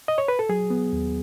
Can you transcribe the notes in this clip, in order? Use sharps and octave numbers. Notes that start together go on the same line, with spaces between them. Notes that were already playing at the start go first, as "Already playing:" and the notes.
D#5
C#5
B4
A4
F#3 G#4
B3
D#2